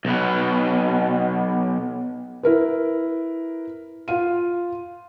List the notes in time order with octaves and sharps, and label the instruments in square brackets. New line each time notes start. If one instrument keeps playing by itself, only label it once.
[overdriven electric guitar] B1 B2
[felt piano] E4 A#4 B4
F4 F5 D#7